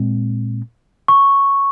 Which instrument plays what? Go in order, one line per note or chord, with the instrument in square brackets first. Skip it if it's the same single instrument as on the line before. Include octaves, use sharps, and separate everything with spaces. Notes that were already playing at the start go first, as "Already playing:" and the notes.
Already playing: [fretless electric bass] A#2 G#3 C4
[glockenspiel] C#6